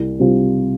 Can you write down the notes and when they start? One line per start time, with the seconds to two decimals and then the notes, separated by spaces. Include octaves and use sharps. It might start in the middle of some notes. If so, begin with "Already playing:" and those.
Already playing: C2
0.19 C3 G3 C4 F4